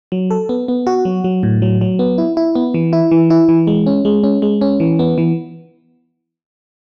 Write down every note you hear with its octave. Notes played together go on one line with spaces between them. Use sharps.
F#3
A4
B3
B3
F#4
F#3
F#3
A2
F#3
F#3
B3
E4
E4
B3
E3
E4
E3
E4
E3
G#3
C#4
G#3
C#4
G#3
C#4
E3
B3
E3